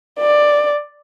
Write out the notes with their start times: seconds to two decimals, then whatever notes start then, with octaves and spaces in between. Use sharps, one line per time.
0.19 D5